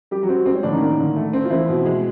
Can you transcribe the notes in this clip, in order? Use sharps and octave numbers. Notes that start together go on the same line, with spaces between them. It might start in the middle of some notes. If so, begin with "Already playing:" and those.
G3 G4
F#3 F#4
C4
G#3 C4
C#4
A2 D3 D4
D#3 D#4
A#3
D3
A3
C4
F4
E3 C4 E4
B2
G#3